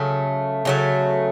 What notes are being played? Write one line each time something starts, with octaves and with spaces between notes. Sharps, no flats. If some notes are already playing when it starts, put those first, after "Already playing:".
Already playing: C#3 F#3 A3
C#3 F#3 A3